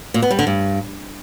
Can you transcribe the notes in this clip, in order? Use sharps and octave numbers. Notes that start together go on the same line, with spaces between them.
A#2
B3
G3
D3
G2